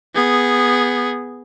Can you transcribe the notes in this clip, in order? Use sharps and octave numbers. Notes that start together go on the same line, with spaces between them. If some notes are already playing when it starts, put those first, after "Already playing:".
B3 G#4